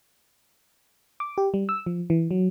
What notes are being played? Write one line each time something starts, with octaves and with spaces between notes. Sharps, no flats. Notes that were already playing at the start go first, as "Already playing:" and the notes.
D6
G4
G3
E6
F3
E3
F#3